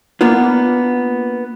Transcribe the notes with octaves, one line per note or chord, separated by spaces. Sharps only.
A#3 B3 D4 F4